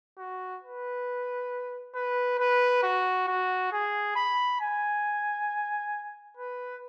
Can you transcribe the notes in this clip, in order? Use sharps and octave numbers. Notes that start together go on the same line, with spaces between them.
F#4
B4
B4
B4
F#4
F#4
G#4
B5
G#5
B4